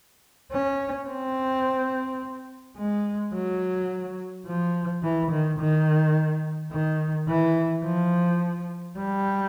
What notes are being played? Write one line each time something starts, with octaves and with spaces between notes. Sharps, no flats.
C#4
C4
G#3
F#3
F3
E3
D#3
D#3
D#3
E3
F3
G3